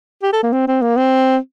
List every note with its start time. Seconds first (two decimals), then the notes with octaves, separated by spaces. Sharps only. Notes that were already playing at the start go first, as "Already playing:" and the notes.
0.23 G4
0.33 A4
0.43 A#3
0.53 C4
0.68 C4
0.82 A#3
0.97 C4